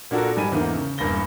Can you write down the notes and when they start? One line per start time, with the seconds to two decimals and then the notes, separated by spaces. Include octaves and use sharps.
0.11 A#2 D4 F#4 A4 A#4
0.36 G#2 G3 G#5 B5 D#7
0.52 E2 G#2 D3 A#3
0.75 C#3
0.98 E1 G2 A#3 B5 A#6 G7